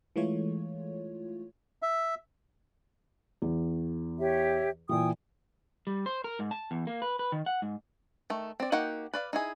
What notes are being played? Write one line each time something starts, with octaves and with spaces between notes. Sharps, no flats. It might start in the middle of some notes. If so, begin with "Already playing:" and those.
E3 G#3 A3 F4 C#5
E5
E2
G4 C#5 E5
A#2 E3 G5 G#5 D#6
G3
C5
A#4
G#2
A5
E2
A#3
B4
B4
D#3
F#5
G#2
D#3 A3
C4 D5
A#3 D#4 F#4 G4 F#5
B4 D5 F5
D#4 E4 G#4